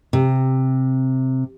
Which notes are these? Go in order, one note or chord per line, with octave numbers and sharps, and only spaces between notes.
C3